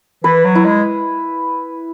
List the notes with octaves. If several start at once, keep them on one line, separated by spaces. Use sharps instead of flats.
E3 B4
F#3
E4
G#3